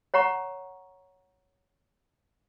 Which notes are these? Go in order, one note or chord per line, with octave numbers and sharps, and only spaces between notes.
C#5 F#5 A#5 C#6